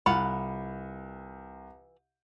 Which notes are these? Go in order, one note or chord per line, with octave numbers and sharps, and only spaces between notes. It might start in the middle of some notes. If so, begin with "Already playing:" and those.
C2 E3 F4 F#5 B5